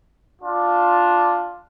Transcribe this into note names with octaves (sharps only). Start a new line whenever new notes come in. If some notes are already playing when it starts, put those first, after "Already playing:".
D4 F4